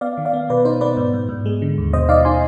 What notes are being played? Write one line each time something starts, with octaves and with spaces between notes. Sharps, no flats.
B3 D5 F5
D#3
D5 F5
B3
B2 B4 D5
D#4 C5
B3 B4 D5
G#2
G#2
G#2
G#3
D3
D#2
B2 C5 D#5
D#4 D5 F5
D#4 G#5 C6